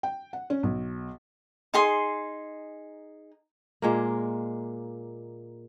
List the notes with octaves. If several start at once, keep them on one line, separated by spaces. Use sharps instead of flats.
G5
F#5
C#4
B1
D#4 G#4 C6
A#2 G#3 A#3